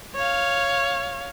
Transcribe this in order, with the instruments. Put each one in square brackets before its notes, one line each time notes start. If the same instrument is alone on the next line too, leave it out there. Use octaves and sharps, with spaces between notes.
[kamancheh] C#5 F5